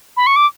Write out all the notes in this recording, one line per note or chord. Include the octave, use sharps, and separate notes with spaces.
B5
C#6
D6